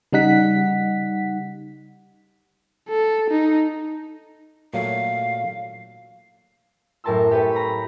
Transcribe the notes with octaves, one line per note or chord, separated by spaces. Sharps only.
C#3 G3 D#4 F#5 B6
A4
D#4
A#2 F#3 A3 F5
F#2 A2 A#4 A5 C6 E6
G4 A4 B4 C#5
A#5 B5